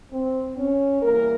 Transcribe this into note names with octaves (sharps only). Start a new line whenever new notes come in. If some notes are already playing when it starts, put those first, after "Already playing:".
C4
C#4
E2 E3 G3 A#3 A#4